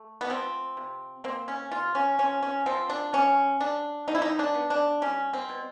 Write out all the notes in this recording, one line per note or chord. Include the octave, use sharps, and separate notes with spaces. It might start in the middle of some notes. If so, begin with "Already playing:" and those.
Already playing: A3
B3
F3 C4
C3
A#3 C4
C#4
C3 F4
C#4
F3 C#4
C#4
F3 C4
D4
F#3 C#4
F#3 D4
F#3 D#4
E4
D#4
D4
B3
D4
G3 C#4
C4
B2